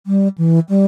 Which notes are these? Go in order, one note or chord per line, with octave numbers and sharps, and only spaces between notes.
G3
E3
G3